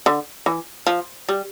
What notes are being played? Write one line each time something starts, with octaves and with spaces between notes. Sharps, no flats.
D3
E3
F3
G3